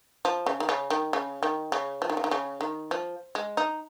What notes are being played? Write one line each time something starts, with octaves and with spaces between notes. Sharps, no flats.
F3
C#3
D#3
C#3
D#3
C#3
D#3
C#3
F3
D#3
C#3
D#3
C#3
D#3
F3
G#3
D#4